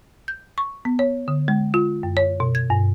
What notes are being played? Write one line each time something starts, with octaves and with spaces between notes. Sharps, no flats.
G6
C#6
B3
C#5
D3
G#3
F4
F#2
C#5
B2
G#6
G2